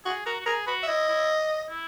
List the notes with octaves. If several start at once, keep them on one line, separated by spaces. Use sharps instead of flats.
F#4 G#4
F#4 A#4
F#4
G#4 A#4
F#4 B4
E5
E4 D#5
E4
E4